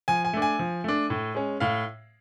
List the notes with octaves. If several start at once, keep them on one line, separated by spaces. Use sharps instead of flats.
F3 G#5
G#5
A3 D4
G#5
F3
A3 D4
A2
G#3 C#4
A2 F5